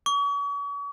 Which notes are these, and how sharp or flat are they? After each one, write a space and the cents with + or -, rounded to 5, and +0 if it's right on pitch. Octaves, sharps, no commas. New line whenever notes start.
C#6 +40